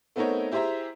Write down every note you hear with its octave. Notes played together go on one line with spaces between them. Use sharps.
A3 B3 C4 D#4 A#4 C#5
E4 G4 G#4 C5 E5 A#5